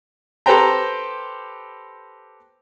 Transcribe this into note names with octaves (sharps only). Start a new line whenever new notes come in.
G4 A4 B4 C5 G5 A#5